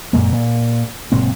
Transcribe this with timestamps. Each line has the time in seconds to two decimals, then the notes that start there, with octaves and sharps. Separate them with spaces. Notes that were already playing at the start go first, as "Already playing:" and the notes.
0.13 F#2 A#2 G#3 A#3
0.32 A#2
1.12 F#1 A#2 G#3 C4